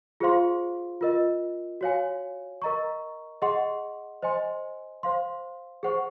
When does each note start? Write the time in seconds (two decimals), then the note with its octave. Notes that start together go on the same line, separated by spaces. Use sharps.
0.20 F4 G#4 C5 F5 C6
1.01 F4 A#4 D#5
1.81 F#4 C#5 F5 G#5
2.62 A#4 D#5 A#5 C#6
3.42 G#4 D#5 F#5 C6
4.22 C5 D#5 G#5 C6
5.03 C5 F5 C6
5.83 G#4 C5 F#5 C#6